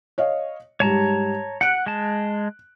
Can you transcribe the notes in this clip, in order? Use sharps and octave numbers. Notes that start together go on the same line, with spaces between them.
C#5 D#5 F5
G#2 G3 C#5 A5 A#5
F#5 F#6 D7
G#3 A5